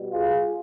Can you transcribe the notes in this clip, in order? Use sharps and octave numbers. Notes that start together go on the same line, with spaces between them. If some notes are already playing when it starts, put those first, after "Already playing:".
Already playing: B2 G3
F4 G#4